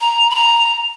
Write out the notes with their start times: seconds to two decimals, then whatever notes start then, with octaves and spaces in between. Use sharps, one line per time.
0.01 A#5
0.30 B5
0.35 A#5